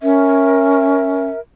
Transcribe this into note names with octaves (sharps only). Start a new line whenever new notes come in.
C#4 A#4 E5